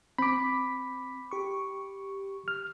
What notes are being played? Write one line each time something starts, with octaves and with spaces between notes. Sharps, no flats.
C4 B5 D6 B6
G4 C#6
F6